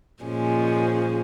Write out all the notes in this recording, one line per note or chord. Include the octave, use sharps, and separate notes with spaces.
A#2 F3 G#3 C#4